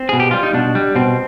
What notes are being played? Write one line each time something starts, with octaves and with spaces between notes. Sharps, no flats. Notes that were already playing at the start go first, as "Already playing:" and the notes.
Already playing: C4
B2 G#4
G4
G3 F4
D#4
B2 D4
G3
B2 C4